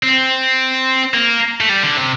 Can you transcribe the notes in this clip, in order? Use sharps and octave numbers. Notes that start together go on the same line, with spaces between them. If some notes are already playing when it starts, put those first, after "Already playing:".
C4
A#3
A3
G3
D3
C3